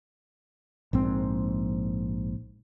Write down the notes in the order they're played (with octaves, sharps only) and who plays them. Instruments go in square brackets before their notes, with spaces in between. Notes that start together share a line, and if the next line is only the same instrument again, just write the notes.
[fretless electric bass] A#1 G#2 C4